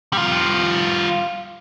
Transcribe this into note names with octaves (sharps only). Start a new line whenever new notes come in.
G3 F4